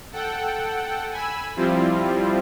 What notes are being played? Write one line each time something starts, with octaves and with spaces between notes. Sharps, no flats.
A4 F#5 G5
G#5 B5 E6
F3 G3 C4 E4 F4